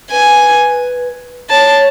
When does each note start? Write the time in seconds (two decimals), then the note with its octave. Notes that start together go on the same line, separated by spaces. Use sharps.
0.11 B4 G#5
1.50 C#5 A5